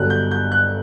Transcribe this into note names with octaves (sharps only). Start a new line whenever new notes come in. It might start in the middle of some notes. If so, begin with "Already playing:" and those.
Already playing: G1 G2 D3 F#3 F#6
G6
G6
F#6